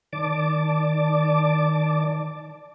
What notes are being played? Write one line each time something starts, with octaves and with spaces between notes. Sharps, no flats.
D#3 D5 A5 D6